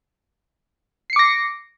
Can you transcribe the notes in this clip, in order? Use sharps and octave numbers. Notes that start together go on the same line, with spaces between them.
D6 A#6 C7 C#7